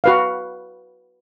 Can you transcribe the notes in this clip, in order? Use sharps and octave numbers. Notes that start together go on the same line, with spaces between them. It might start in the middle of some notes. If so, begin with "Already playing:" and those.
F#4 B4 F5